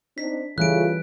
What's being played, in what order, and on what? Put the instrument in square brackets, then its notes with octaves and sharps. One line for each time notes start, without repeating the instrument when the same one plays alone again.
[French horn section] C4 D4 D#4 [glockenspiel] B6
[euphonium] C#3 [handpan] E3 G3 [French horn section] A3 F4 [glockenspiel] F#6 D7